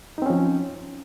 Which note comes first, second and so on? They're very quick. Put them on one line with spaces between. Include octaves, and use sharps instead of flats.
D#4 C4 C#4 F3